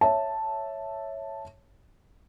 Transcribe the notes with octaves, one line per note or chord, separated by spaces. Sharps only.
C#5 E5 A5